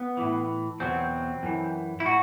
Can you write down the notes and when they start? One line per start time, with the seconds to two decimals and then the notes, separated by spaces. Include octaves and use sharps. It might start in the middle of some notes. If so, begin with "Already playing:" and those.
Already playing: B3
0.17 A2 E3
0.80 E2 B2 F#3 C4
1.43 F#2 E3
2.00 E4
2.05 A2 F#4